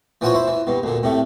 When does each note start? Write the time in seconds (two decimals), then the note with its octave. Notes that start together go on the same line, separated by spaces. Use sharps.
0.21 E3 F3 F4 F#4 C5 C#5
0.34 E4 C5
0.47 E3
0.67 G2 B2
0.83 D2 A#2 D3
1.03 A2 C3 A3